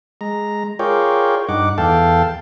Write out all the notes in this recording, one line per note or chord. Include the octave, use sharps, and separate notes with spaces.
G#3 A#5
F4 G#4 A#4 C#5 D5 G5
G2 D#4 F#5 D6
E2 A4 F5 G5 A5